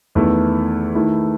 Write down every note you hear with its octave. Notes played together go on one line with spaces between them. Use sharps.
E2 D#3 A3 E4
D#3 A3 E4